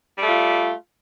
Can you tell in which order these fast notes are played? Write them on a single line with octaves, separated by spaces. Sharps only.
G3 A3 F4